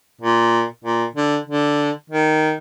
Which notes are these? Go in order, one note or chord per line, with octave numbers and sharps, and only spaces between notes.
A#2
A#2
D3
D3
D#3